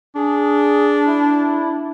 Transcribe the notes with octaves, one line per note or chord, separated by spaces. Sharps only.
D4 G#4
E4